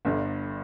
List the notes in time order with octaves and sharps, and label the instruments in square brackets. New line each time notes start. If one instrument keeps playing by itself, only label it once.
[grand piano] G1 G2 D3